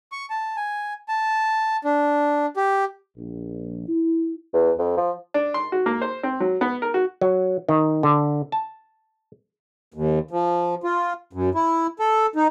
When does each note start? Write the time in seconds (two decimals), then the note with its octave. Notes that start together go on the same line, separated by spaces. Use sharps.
0.12 C#6
0.30 A5
0.57 G#5
1.08 A5
1.84 D4
2.57 G4
3.17 A#1
3.89 E4
4.54 E2
4.79 F2
4.97 F3
5.34 D4
5.54 C6
5.72 F#4
5.86 A#3
6.02 C5
6.23 C4
6.40 F#3
6.61 B3
6.82 A#4
6.94 F#4
7.21 F#3
7.69 D#3
8.03 D3
8.52 A5
9.94 D#2
10.31 F3
10.84 F4
11.33 F#2
11.55 E4
12.00 A4
12.36 D#4